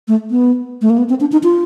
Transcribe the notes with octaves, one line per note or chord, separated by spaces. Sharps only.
A3
B3
A3
A#3
B3
C4
D4
D#4
F4